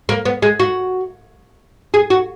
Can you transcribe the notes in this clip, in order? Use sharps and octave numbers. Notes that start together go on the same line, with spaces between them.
A#3
B3
G#3
F#4
G#4
F#4